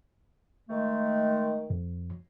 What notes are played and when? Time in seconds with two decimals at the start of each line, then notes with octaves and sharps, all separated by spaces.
0.69 D#3 G#3 A3
1.70 F2